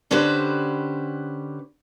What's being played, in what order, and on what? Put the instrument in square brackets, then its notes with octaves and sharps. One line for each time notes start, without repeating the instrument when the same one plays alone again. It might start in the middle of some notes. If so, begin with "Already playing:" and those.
[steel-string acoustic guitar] D3 C#4 F#4 G4 B4 C5